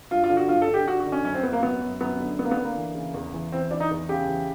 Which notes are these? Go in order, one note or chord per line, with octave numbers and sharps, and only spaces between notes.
G2 F4
F4
D3
F#4
G2 F4
A4
D3
G4
D3 F#4
F#4
D3
C#4
F#2 C#4
C4
F#2 B3
A#3
F#2 B3
F#2
F#2 B3
D3
D3 B3
A#3
B3
D3
A#3
E3
C#3
E2
E3
E3 C4
E3 D4
D#4
E2
C#3 G4
E3